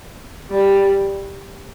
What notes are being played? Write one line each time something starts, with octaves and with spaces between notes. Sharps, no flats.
G3